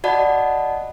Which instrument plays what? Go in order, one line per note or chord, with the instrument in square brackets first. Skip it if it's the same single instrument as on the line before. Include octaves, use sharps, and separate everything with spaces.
[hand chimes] F#4 D5 D#5 F#5 A5 B5